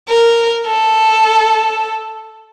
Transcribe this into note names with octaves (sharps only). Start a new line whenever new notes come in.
A#4
A4